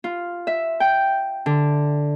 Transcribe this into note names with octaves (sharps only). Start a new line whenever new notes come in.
F4
E5
G5
D3